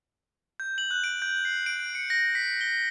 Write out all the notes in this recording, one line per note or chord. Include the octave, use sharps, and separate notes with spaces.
G6
F#7
F#6
D7
G6
C7
D7
C#7
A#6
B6
G7